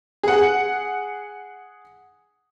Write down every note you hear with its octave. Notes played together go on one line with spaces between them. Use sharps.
G#4 F#5